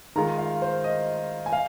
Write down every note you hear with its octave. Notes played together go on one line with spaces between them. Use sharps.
D#3 G#3 F4 A#5
F5
C5
D#5
G#5
F5